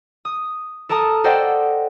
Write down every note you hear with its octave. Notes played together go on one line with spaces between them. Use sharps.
D#6
A4 A#4 A5 A#5 D#6
A4 C5 D5 D#5 F#5 G5